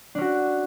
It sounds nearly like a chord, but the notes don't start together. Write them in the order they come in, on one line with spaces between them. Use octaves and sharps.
D4 C#4 F#4